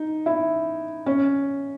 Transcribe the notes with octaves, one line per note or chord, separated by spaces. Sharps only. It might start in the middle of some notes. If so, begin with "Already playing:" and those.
Already playing: D#4
E4
C#4